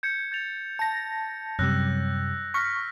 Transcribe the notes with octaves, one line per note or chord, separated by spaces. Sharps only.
G6 G#6 C#7
G6 A6 F7
A5 A#6
F#2 C3 G3 E6 F#6 A#6
C#6 F6 A#6 B6